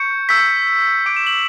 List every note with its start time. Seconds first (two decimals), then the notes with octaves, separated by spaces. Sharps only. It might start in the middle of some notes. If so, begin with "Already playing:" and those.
Already playing: C#6 G6 C#7
0.29 C#6 E6 G6 B6
1.06 D6 G6 D7
1.16 E7
1.27 F#7